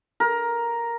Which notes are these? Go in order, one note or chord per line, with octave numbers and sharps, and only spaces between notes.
A#4